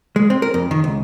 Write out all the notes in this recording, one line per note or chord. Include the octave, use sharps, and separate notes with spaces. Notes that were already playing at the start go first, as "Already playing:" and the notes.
G#3
C4
A#4
F2
D#3
C#2